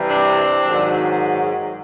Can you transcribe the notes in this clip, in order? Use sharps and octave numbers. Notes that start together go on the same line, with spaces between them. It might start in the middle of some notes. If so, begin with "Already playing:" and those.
Already playing: C3 E3 G3
C4 D4
G#2 D#3 F#3